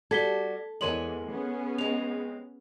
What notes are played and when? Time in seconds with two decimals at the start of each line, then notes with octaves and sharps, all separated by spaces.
0.11 G3 F#4 A4 G#6 B6 G7
0.81 E2 G#3 A#4 C#5 G#5 C6 F#7
1.31 B3 C#4 G#4
1.78 G#3 C4 F7